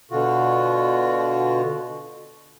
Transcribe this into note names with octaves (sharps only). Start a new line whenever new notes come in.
B2 D3 F4 F#4